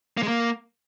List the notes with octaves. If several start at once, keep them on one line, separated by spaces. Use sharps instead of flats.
A#3
G#3
A#3